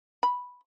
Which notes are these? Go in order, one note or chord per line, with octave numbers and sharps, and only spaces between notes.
B5